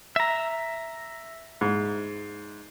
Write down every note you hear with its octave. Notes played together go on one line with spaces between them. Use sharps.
E5 A#5
G#2